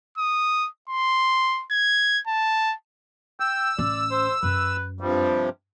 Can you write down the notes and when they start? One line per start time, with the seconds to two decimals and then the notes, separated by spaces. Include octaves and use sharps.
0.18 D#6
0.89 C6
1.71 G#6
2.27 A5
3.40 G5 E6
3.78 A1 C#4 D5
4.11 C5
4.43 F#2 B4
5.01 G2 C3 F3 G3